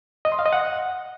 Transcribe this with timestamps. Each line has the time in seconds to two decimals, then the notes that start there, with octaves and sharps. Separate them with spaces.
0.25 D#5
0.32 C6
0.39 F5
0.46 D#5
0.53 F#5